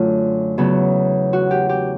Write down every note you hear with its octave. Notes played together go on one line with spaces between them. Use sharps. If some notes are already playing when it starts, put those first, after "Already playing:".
Already playing: F#2 D3 F#3 A3 F4
E2 C#3 F#3 B3
F#4
G4
G4